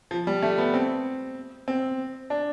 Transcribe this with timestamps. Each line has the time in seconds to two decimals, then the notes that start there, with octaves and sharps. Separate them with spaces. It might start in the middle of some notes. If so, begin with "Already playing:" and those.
0.11 F3
0.27 G3
0.43 A3
0.58 B3
0.74 C4
1.68 C4
2.30 D4